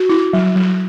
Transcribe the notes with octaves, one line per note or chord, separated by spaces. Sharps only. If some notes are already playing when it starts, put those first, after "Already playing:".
Already playing: F#4
E4
F#3
F#3